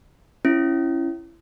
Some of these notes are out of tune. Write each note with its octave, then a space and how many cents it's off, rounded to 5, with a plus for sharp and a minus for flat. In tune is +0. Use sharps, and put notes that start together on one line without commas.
C#4 -10 E4 +20